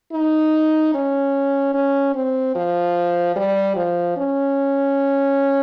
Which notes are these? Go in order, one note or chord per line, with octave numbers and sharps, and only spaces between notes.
D#4
C#4
C#4
C4
F3
G3
F3
C#4